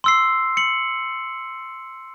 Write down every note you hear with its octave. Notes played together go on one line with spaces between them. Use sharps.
C6 E6 C7
C#7 F#7